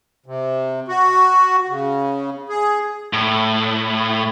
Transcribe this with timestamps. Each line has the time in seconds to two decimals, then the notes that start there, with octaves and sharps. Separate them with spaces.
0.26 C3
0.88 F#4
1.68 C#3
2.49 G#4
3.13 A2